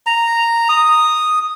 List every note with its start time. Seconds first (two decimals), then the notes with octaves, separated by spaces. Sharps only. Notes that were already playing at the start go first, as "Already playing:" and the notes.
0.07 A#5
0.69 D#6